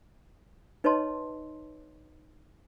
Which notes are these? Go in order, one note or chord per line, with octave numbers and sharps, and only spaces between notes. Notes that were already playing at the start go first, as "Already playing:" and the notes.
D#4 B4 C#5 D#5 A5 C6